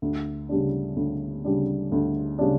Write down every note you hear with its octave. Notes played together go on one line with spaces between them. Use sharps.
D2
C#3 G3 D4
D2
C#3 G3 D4
D2
C#3 G3 D4